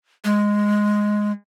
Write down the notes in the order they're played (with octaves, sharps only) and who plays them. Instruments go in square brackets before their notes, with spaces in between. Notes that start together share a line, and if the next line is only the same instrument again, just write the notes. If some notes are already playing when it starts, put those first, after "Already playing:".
[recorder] G#3